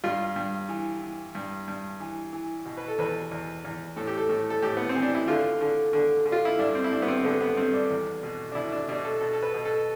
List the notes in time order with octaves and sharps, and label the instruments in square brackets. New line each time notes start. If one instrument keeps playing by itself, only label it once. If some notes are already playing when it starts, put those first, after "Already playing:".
[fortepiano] G2 F4
G2
E3
E3
G2
G2
E3
E3
B2
B4
A4
E2 B4
E2
E2
A2 A4
G4
A4
A2
A4
A2 G4
B3
C4
E3
D4
E4
D3 F4
D3
D3
D3
F4
E4
G2 D4
C4
E4
G2 D4
B3
C4
D3 B3
B3
G2 C4
D4
E2
B2
D4
B2 E4
D4
B2 D4
A4
B2 A4
A4
B4
B2
A4